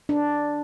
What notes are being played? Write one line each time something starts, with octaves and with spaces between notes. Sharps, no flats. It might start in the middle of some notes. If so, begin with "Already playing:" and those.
D4